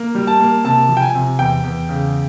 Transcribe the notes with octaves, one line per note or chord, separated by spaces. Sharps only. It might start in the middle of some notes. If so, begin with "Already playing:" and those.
Already playing: A#3
G3
A5
A#3
C3 A5
F3
G5
G#5
C3
E2 G5
E2
C#3